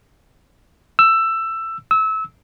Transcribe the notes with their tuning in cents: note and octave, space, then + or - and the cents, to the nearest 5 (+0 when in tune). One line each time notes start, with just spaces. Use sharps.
E6 +15
E6 -25